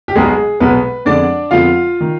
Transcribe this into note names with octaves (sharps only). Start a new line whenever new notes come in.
G4
B1 B2 G#3 B3 G#4
B1 B2 G#3 B3 B4
F2 D3 G#3 B3 D4 D5
F2 D3 G#3 B3 F4 F5
D#3